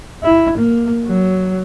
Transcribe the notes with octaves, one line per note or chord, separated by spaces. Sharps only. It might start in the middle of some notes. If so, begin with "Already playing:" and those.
E4
A#3
F#3